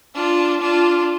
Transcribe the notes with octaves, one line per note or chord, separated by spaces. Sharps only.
D4 F4
D4 F4